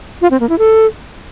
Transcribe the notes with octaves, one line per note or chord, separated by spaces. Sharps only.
F4
C4
A#3
E4
A4